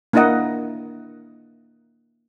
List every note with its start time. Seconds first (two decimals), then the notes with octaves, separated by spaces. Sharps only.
0.13 A#3 D4 E4 A#4 D#5 F#5